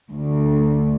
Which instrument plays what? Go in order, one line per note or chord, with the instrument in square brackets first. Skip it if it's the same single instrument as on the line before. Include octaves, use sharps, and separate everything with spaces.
[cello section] D2